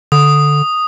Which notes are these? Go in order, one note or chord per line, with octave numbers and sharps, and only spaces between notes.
D3 D#6